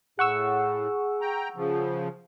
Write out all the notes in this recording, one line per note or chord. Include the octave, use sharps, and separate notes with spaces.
A2 G#4 F#5 C#6 E6
G5 A#5
C#3 F3